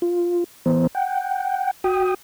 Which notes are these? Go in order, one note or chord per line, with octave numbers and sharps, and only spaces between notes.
F4
E3 B3 C5
F#5 G5
F#4 G5 D#6